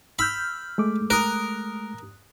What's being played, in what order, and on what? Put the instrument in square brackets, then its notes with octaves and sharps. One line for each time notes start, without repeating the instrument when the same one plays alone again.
[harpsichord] B5 [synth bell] E6 F6 G6
[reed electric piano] G#3 A3 D6
[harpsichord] A#4 [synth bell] D#6 F#6